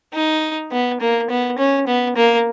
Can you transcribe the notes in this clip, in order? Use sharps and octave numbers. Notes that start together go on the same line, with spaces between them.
D#4
B3
A#3
B3
C#4
B3
A#3